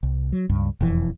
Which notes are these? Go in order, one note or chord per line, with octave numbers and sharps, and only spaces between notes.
C2
F#3
C#2 G2
E1 F2 E3